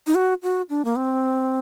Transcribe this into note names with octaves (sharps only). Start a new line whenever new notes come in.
D#4
F#4
F#4
D4
A#3
C4